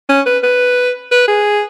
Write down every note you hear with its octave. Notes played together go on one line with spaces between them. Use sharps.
C#4
B4
B4
B4
G#4